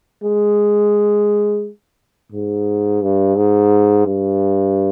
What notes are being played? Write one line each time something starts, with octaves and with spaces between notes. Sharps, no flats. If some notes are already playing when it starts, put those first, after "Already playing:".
G#3
G#2
G2
G#2
G2